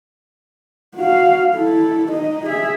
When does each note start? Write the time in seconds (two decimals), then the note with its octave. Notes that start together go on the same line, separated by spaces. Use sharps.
0.96 F#4 F5
1.54 E4 A4
2.11 D#4 D#5
2.46 G#4 E5